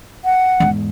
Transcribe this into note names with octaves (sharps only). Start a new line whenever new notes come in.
F#5
E2 G#2